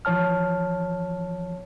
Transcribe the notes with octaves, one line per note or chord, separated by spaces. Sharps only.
E3 F3 C#5 A5 F6